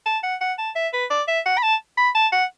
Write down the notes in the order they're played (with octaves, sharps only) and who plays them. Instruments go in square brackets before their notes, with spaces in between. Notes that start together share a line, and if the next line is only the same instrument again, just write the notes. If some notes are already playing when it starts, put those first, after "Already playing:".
[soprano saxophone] A5
F#5
F#5
A5
E5
B4
D5
E5
F#5
B5
A5
B5
A5
F#5